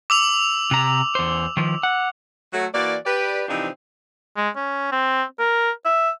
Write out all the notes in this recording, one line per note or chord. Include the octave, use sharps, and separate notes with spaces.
D6 E6 F7
C3 A#5
E2 C5
D#3 F3
F#5
F#3 A3 F#4
E3 A#3 F#4 D5
G4 B4 D5
C3 E3 F3 C4 D4 D#4
G#3
C#4
C4
A#4
E5